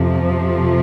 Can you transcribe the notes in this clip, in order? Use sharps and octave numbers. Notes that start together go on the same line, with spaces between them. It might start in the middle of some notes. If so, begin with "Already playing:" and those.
Already playing: F2 C3 F3